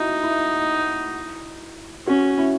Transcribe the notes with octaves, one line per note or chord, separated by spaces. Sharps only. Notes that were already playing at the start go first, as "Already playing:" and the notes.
Already playing: D#4 E4 F#4
E4
C#4 F#4
E4